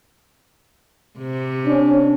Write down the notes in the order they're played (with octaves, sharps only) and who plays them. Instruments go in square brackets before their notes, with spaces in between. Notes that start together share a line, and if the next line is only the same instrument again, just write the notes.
[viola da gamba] C3
[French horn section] C#4 D4